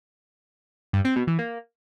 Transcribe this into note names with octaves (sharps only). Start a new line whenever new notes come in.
G2
C4
B2
E3
A#3